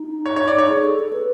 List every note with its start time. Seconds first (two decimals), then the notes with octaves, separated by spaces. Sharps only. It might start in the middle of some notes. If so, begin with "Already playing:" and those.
Already playing: D#4
0.26 C#5
0.36 C#5
0.48 D5
0.58 C#5
0.69 G#4
0.85 A4
0.99 A4
1.13 B4